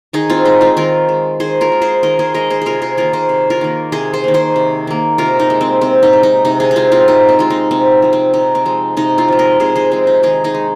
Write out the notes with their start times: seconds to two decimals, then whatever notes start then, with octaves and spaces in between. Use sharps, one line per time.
0.13 D#3 D#4 G#4
0.30 C4 F4
0.45 G#3 D#4
0.61 C4 F4
0.77 D#3 F4 A#4
1.09 G#3
1.40 D#3 G#4 C5
1.61 F4 A#4
1.72 G#3
1.82 G#4 C5
2.03 D#3 A#4 D#5
2.19 G#4 C5
2.34 G#3 A#4 D#5
2.50 G#4 C5
2.62 C3 F4 G#4 A#4
2.82 G#4 C5
2.97 D#3 A#3 F4 A#4
3.13 G#4 C5
3.29 C3
3.50 F4 A#4
3.61 D#3 A#3
3.92 C3 G#4 C5
4.13 G#4 C5
4.24 D#3 A#3
4.34 G#4 C5
4.56 C3
4.87 D#3 A#3
5.18 C3 F4 A#4
5.40 D#4
5.50 G#3
5.61 C4
5.81 C3 C4
6.03 D#4
6.13 G#3
6.23 D#4
6.45 C3 D#4
6.60 D#4 G#4
6.71 D#4
6.76 G#3 C4 F4
6.92 C4 F4
7.08 C3 D#4
7.29 C4
7.39 G#3 F4
7.50 D#4
7.71 C3 C4
8.02 F3 G#3
8.13 C4
8.34 C3 D#4
8.55 C4
8.66 F3 G#3
8.97 C3 D#4
9.18 C4 F4
9.28 F3 G#3
9.39 A#4 D#5
9.60 C3 G#4 C5
9.76 G#4 C5
9.92 F3 G#3 C4
10.07 D#4
10.23 D#3 D#4 G#4
10.44 D#4 G#4
10.54 G#3